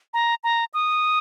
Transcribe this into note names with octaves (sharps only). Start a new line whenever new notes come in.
A#5
A#5
D#6